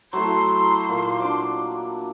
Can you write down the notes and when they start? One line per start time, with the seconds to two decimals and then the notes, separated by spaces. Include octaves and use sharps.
0.13 F#3 A3 E4 C6
0.89 A#2 A#3
1.20 D4 D6